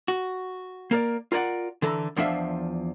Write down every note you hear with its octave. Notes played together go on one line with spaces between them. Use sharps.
F#4
A#3 A#4 D5
F4 A#4 C5 D5 F#5
D3 E3 A4 A#5
E2 F3 D4 B4 E5 F5